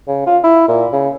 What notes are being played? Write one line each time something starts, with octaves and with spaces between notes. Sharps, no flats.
C#3
F4
E4
A#2
C#3